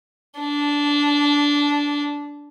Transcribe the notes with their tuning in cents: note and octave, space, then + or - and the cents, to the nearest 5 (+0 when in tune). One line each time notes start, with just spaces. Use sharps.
D4 -15